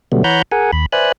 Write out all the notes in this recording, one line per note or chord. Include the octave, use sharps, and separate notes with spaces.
B2 D3 F#3 G3 A3 B3
E3 C#5 F#5 A#5 B5 G6
G#4 A#4 F#5 G#5
D#2 B5
B4 C5 D5 E5 G#5 F#6